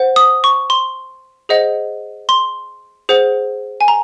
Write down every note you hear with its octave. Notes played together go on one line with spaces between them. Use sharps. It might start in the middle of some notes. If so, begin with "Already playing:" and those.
Already playing: C5 F#5
D#6
C#6
C6
G#4 C5 D#5 F#5
C6
G#4 C5 F#5
G#5
A#5